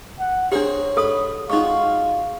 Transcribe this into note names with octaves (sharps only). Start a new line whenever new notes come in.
F#5
C4 D4 G4 G#4 A#4 C#5
G#2 A4 B5 D#6
G#3 D#4 F4 F#4 F5 C#6